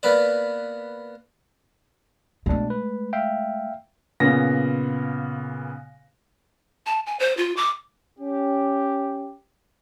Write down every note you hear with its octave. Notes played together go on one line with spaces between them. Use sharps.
A#3 B3 B4 D5
B2 G#3 A3 D4
B4
E5 F5 G5
A#2 C#3 B3 A#6
A5
G#5
C5
F4
D6
C#4 G4